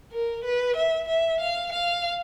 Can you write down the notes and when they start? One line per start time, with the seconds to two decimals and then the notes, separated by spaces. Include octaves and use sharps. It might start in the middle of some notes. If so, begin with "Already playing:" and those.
0.12 A#4
0.44 B4
0.76 E5
1.08 E5
1.40 F5
1.72 F5